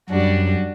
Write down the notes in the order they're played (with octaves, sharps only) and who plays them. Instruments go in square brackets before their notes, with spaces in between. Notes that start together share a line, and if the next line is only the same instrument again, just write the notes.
[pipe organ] F#2 [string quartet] G3 D4 F#4